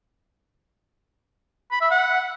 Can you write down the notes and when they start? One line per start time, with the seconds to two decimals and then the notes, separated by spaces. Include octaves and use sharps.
1.71 B5
1.81 E5
1.91 F#5